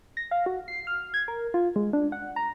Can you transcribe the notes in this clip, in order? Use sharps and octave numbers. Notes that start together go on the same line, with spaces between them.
A#6
F5
F#4
C7
F6
G#6
A#4
F4
G#3
D4
F#5
A#5